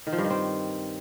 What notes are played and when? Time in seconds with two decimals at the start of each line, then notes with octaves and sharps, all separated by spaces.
0.07 D#3
0.12 F3
0.18 G2
0.24 D#3
0.30 C4